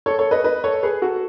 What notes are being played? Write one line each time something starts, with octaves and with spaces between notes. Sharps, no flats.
A4 C#5
A4 C#5
B4 D#5
B4 D#5
A4 C#5
G#4 B4
F#4 A4